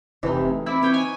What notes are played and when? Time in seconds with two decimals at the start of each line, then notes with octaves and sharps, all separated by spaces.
0.23 F1 C3 E3 D#4
0.48 A3
0.66 C4 E4 D5 B5
0.82 C4 B4 C#5 G5
0.94 D#4 G#5